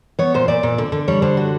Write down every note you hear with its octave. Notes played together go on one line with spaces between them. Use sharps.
B3 C#5
A#2 C5
A#2 D5
A#2
D3
D3
G3 C#5
D3 C5
F#4